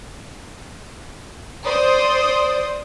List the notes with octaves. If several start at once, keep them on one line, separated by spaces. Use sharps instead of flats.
C5 D5 D#6